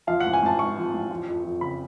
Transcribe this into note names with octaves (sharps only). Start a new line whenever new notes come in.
F3 F5
F#5
A1
G#5
A1 A5
G#2 C#6
F3
A1
F3
F2
F2
C#3 B5